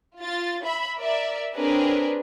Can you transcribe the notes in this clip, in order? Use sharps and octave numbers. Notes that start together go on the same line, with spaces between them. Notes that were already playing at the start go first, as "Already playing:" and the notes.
F4 A6
E5 B5
A#4 D5 E5
C4 D4 G#4 A#4 B4 C#5